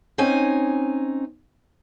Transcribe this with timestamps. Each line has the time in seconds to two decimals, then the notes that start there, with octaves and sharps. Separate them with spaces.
0.18 C4 C#4 D#4 G#5